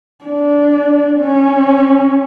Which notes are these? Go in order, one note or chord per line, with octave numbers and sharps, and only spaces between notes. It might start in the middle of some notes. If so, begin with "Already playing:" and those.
D4
C#4